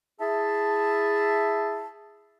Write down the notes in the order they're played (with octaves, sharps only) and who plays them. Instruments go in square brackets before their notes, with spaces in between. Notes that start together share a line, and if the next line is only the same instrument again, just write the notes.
[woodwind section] E4 G#4 E5 A5